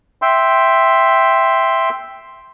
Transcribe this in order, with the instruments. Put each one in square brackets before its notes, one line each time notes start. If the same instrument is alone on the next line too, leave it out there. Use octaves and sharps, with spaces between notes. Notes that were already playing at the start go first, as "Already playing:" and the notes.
[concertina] E5 G5 C6